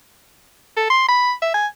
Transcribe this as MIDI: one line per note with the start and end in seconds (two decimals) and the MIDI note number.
0.77 0.87 69
0.90 1.08 84
1.09 1.33 83
1.42 1.52 76
1.54 1.67 80